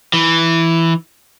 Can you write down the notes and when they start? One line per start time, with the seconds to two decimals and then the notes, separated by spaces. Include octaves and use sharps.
0.13 E3